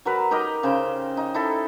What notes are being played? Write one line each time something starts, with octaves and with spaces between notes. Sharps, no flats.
F#3 A#4 B4
D#4 G4 A#4 D#5
C#3 C5 G5
D#4
D#4 E4 A4